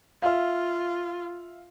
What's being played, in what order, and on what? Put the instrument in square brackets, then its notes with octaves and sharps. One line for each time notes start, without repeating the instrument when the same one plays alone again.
[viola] F4 [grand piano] E5 F5